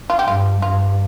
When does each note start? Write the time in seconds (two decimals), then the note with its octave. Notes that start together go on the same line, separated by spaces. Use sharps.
0.10 F4
0.19 G4
0.27 G2 F4
0.62 G2 F4